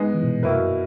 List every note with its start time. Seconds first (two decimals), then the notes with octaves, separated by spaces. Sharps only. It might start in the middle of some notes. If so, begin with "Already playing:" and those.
Already playing: G#3 B3 D#4
0.15 E3
0.23 B2
0.33 A#2
0.42 F#2 B2 A#3 E4 B4